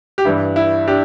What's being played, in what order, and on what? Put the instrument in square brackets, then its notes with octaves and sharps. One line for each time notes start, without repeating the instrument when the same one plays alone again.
[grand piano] G4
G2 E3 G3 E4
E4
D4 G4